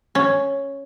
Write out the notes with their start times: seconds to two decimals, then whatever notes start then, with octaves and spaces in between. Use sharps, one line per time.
0.15 C#4